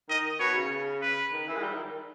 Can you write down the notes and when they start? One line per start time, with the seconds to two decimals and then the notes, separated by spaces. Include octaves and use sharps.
0.09 D#3 D#5
0.39 B2 C#5
0.56 C#3
1.02 B4
1.32 D#3
1.48 E3
1.57 G#3
1.63 G3
1.73 D#3